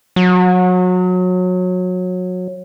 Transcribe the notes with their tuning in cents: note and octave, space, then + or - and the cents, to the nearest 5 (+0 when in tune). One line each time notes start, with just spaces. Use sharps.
F#3 -25